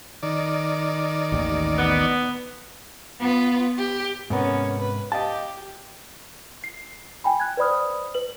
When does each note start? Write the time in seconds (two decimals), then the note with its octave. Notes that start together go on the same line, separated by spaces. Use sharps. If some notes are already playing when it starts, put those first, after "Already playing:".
0.23 D#3 D5
1.32 A1 D#2
1.78 B3
3.20 B3 F4 B4
3.77 G4
4.30 G#2 C3 B3 C#4 A#4
4.80 B4
5.12 G4 D#5 F5 A5
6.64 C7
7.24 G5 G#5 B5
7.40 F#6 G#6
7.57 B4 C5 D5 B5 D#6 F6
8.14 B4 F#7